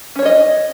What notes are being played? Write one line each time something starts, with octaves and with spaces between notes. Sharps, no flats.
C#4 D4 C#5 D#5